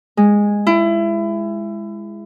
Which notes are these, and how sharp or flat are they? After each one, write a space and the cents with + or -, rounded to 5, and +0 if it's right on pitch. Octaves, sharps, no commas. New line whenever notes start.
G#3 -10
E4 +25